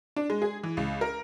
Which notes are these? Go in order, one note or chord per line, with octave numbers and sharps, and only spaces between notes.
D4
G#3
G#4
E3
C#2
A#4